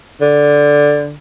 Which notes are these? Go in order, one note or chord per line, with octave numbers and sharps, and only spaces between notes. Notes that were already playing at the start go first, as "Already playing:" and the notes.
D3